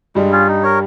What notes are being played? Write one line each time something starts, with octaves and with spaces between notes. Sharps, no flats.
G2 G3 G#3
C#4 F4 G#4
D#4
A#4 C#5